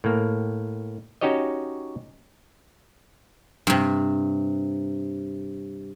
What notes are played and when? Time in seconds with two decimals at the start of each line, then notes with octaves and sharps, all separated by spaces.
0.04 A2 A#3
1.21 C#4 D#4 F#4 G4 C#5 D#5
3.67 G2 C3